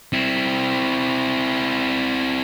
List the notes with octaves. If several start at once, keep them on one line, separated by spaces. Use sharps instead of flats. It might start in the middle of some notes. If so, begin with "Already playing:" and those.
C4 E4